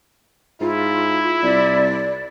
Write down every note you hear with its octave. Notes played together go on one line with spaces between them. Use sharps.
G#2 E4 F4
C2 D5